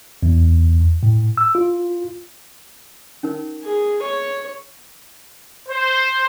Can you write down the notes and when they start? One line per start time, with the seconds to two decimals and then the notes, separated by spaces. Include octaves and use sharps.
0.23 E2
1.03 A2
1.37 E6
1.55 F4
3.23 C#4 D#4 A#4
3.64 G#4
4.02 C#5
5.68 C5